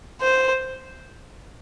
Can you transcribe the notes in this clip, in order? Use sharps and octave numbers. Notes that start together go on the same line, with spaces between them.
C5